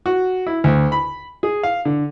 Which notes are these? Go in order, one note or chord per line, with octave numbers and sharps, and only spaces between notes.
F#4
E4
D2
B5
G#4
F5
D3